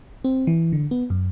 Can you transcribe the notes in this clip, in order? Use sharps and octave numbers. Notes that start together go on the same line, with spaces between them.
C4
E3
D3
B3
F#2